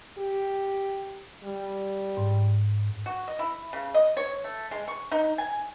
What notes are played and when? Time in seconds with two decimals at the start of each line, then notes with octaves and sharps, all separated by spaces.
0.18 G4
1.44 G3
2.17 G#2
3.06 F#4
3.28 D#5
3.39 E4
3.73 C#3
3.94 D#5
4.17 C#5
4.44 A3
4.71 G#3
4.88 C#6
5.12 D#4
5.38 G#5